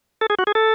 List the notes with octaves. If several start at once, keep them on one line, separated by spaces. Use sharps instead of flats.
A4
G#4
F#4
G#4
A4